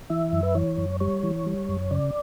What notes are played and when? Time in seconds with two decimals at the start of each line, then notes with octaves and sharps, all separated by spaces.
0.10 E3 E5
0.33 F#2
0.43 B4
0.55 E3 C#5
0.78 F#2
1.00 G3 C#5
1.23 E3
1.46 G3
1.69 F#2
1.91 C#3 D5